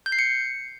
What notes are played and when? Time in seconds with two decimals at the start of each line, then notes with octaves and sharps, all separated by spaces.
0.06 G6
0.12 C7
0.19 C#7